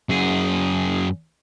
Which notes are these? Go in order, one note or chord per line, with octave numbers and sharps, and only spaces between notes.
F#2 G#4